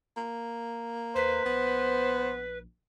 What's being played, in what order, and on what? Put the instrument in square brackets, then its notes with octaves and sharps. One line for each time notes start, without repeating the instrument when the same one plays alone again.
[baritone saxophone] A#3
[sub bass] D#2 [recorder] B4 [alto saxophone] C5
[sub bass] A#1 [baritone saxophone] B3